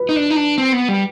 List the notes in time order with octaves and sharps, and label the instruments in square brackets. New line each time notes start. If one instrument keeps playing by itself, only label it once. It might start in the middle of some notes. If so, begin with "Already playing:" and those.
Already playing: [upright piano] B4
[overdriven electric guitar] D#4
D4
D#4
D4
C4
B3
G3